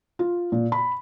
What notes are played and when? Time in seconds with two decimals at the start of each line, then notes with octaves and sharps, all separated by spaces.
0.19 F4
0.52 A#2
0.72 B5